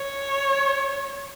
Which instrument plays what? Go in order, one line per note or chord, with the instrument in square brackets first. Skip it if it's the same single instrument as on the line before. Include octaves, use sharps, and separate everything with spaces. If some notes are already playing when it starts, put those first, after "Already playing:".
Already playing: [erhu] C#5